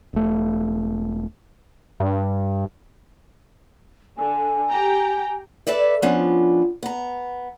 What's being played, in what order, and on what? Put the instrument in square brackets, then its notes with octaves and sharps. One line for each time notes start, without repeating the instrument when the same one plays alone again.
[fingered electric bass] E1 A3
[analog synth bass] G2
[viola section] D3 [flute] G#5
[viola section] G4 G5 A#5
[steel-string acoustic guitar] A4 B4 D5 E5
F3 B3 C#4 D4 F4
B3 A#5